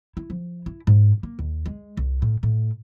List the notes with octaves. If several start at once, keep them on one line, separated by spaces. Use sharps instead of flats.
E4
F3
E4
G#2
A#3
D#2
G#3
C2
A2
A2